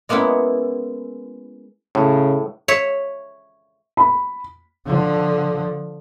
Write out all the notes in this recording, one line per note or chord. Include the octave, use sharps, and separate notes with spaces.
G#3 A#3 B3 C#4 E4
A2 C#3
C#5 E5
B5
D3 F3